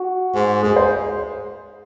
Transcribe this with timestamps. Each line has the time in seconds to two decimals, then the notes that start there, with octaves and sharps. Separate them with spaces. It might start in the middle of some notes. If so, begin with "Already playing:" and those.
Already playing: F#4
0.34 G#2
0.63 G#2 G#4
0.76 C5